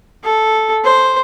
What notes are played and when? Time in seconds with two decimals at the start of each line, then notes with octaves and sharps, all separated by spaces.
0.24 A4
0.84 C5